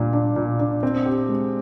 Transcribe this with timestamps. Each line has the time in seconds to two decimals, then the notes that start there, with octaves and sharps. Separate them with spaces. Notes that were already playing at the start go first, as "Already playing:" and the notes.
Already playing: A#2 G3 D4
0.13 D4
0.36 A#2
0.59 D4
0.83 C4
1.06 G4
1.29 G#3